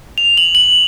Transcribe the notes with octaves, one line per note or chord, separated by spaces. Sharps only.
F7
F#7
F#7